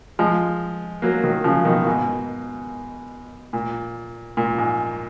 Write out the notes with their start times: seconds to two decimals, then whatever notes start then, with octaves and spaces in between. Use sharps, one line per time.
0.19 F3 G#3
1.02 F#3 A#3
1.23 D#3 F#3
1.44 C#3 F3
1.65 B2 D#3
1.87 G#2 B2
3.53 A#2
4.37 A#2
4.58 G#2